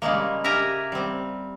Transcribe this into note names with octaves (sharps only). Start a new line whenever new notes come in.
C#3 G3 G#3 A#3
G4 A#4 E5 G#5 A#5
G3 C4